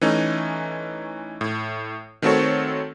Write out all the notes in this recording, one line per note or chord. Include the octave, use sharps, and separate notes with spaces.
E3 A3 C#4 D#4
A2
D#3 A3 C4 F#4 A4 C#5